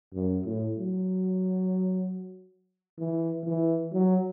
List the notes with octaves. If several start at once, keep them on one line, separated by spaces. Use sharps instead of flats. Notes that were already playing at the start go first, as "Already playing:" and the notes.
F#2
A2
F#3
E3
E3
F#3